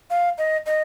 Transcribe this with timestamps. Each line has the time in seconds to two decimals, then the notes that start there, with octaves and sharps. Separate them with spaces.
0.10 F5
0.38 D#5
0.66 D#5